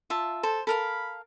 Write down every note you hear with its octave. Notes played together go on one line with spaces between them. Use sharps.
F4 E5 A5
A4 C5
A4 A#4 F5 B5